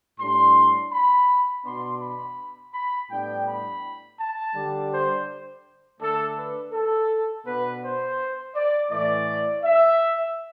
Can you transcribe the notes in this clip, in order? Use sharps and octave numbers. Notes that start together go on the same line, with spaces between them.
A2 G3 D4 C6
B5
B2 B3 D4 C6
B5
B5
A2 G3 B3 D4 G5
B5
A5
D3 G3 D4
C5
D3 A3 D4 A4
B4
A4
B2 B3 D4 B4
C5
D5
A2 E3 A3 D5
E5